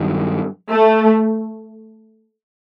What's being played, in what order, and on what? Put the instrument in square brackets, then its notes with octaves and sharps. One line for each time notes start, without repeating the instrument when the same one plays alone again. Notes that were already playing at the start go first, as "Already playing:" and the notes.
Already playing: [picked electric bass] G2 D#3 F#3
[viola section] A3